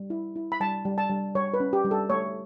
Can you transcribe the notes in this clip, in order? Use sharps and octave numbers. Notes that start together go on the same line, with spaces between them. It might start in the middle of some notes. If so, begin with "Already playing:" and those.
Already playing: G3
E4
E4
B5
G3 A5
G3
A5
G3
G3 C#5
B4
C#4
G4
G3
A4
A3 C#5